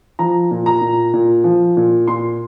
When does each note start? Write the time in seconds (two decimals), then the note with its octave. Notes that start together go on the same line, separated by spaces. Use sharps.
0.19 F3 A#5
0.51 A#2
0.66 A#5
0.81 A#2
1.13 A#2
1.44 F3
1.77 A#2
2.08 A#2 C6